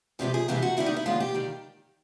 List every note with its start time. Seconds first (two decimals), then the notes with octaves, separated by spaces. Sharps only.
0.19 E2 C3 F3 G#3 G4
0.34 G#4
0.48 F2 C3 E3 G#3 G4
0.62 F#4
0.77 G2 D#3 G3 E4
0.86 D#4
0.97 E4
1.06 D#2 D3 F3 G#3 F4
1.20 G4
1.35 D#3 G3